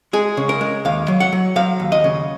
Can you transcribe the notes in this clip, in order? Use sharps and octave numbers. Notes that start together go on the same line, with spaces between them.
G#3 G#4
C#3
A#4
G#3
D#2 F5
F#3
F#5
F#3
F#3 F5
D#2
D#5
C#3